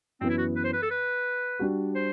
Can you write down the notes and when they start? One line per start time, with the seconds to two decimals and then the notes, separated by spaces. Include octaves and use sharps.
0.20 F#2 E3 B3 C4
0.29 E4
0.38 F#4
0.56 B4
0.64 C5
0.73 B4
0.82 A4
0.91 B4
1.59 G3 D4 F#4
1.95 C5